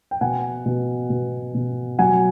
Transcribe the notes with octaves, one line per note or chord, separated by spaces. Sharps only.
G5
B2 F#5 G#5
B2
B2
B2
F#3 F#5 G#5